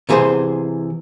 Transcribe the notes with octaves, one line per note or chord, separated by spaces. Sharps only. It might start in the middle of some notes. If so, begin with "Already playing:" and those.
C3 E3 G#4 A#4 C5